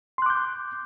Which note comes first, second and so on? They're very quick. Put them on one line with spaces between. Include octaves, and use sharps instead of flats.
C6 F#6 D6 G6